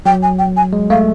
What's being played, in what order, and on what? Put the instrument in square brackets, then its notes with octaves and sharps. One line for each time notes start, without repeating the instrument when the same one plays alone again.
[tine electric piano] F#3 [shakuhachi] G5
[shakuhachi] G#5
G5
G#5
[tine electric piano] G#3
[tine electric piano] A3 [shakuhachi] F5